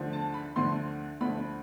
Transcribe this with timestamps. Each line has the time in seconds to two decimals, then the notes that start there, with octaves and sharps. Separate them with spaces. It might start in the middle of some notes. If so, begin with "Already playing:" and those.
Already playing: D2 D3 F3
0.13 A5
0.34 B5
0.56 D2 D3 F3 C6
1.21 D2 D3 F3 B5